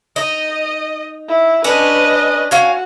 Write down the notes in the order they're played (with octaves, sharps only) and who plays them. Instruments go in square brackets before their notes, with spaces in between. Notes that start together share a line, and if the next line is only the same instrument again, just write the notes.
[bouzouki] D#4 [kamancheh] D#5
[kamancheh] E4
[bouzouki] C#4 D4 [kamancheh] B4 D#5
[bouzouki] C#4 F5 G#5 [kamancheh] F#4